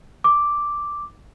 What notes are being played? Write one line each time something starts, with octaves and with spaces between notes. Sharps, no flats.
D6